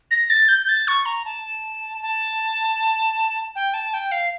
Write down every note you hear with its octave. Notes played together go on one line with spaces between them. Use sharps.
A#6
A6
G6
A6
C#6
A#5
A5
A5
G5
A5
G5
F5